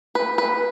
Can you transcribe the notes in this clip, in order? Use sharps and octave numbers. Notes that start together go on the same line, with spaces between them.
B4
B4